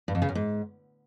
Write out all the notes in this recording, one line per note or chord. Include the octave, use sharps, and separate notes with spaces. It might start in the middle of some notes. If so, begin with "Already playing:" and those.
G2
F2
C#3
F#2
G#2